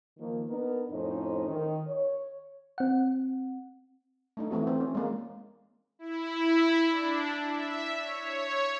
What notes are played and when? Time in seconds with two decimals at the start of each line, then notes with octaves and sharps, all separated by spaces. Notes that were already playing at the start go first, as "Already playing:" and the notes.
0.20 D#3 F3 A#3
0.49 B3 D4 D#4 A#4
0.92 F2 A2 C#4 D#4 C5
1.48 D#3
1.88 C#5
2.78 C4 F#5
4.37 A3 D4 D#4
4.51 E3 A3 C4 F#4
4.67 C4
4.81 C#4
4.95 G#3 A#3
5.99 E4
6.90 D4
7.50 E5
8.01 C#5